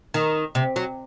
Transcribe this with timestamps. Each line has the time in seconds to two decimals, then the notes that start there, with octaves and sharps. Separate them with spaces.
0.14 D#3
0.55 C3
0.76 F#3